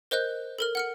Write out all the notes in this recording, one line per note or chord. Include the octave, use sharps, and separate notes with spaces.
A#4 C5 D#5 F#6 G6
A4 A#4 F6
F#5 F6 C#7